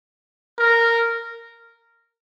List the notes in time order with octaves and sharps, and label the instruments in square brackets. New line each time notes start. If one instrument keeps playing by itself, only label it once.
[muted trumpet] A#4